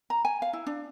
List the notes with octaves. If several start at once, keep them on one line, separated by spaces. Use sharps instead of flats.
A#5
G#5
F5
E4
D4